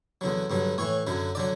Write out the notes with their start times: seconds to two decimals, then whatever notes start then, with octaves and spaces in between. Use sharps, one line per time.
0.21 E2 D3 F#3
0.50 G2 D3 F#3
0.78 A2 E3 C#5
1.07 F#2 D3 F#3
1.35 D3 F#3 D5